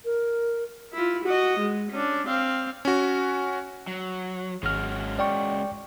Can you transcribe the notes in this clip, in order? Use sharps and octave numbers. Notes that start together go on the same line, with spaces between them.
A#4
E4 F4
F#4 D#5
G#3
C#4 D4
C4 F5
C#4 F#4
F#3
G#1 G#3 C#4 F#4 F6
D5 G5 C#6